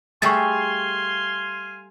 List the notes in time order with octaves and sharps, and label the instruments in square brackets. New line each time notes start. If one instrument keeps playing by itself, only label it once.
[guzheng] G3 A3 G#4 [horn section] F5 G#5 C6 [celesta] C#6 A6